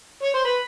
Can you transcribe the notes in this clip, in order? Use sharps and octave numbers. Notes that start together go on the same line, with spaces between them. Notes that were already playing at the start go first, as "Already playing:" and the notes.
C#5
C5
B4